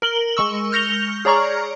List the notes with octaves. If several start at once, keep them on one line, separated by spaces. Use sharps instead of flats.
A#4 F#7 G7
G#3 C#6 E6
F6 G6 A#6 C#7 F7 G7
G#4 C#5 D5 A#5 C#6 F6